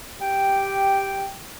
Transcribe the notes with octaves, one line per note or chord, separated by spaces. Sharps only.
G4 G5